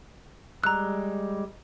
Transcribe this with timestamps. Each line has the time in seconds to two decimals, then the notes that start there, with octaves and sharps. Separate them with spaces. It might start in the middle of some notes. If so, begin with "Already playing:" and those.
0.64 G3 G#3 A#5 E6 F#6